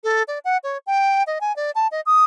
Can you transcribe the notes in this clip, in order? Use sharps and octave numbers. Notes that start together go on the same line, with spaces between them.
A4
D5
F#5
C#5
G5
D#5
G#5
D5
A5
D#5
D#6